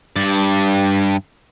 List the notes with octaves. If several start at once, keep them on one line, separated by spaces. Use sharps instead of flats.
G2 D5